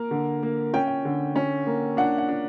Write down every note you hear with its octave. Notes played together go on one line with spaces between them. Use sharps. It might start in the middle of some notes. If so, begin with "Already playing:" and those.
Already playing: A#3 A#4
D3
A#3
C#4 G5
G5
D3
C#4
A#3
D4 F#5
F#5
D4